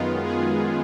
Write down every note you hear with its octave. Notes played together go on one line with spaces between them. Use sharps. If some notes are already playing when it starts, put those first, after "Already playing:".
Already playing: F#2 D#3 G#3 B3 F4
G#4